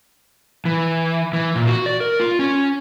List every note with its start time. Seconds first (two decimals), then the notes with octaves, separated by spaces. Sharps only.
0.65 E3
1.33 E3
1.55 A#2
1.67 F#4
1.86 D5
2.01 A#4
2.20 F4
2.39 C#4